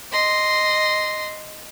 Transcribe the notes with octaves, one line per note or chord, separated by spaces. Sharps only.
D#5 C6